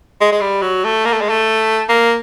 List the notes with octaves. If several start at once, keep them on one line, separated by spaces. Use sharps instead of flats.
G#3
G#3
G3
F#3
A3
A#3
A3
G#3
A3
A#3